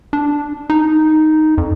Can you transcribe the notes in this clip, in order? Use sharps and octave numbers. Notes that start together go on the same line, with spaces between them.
D4
D#4
F2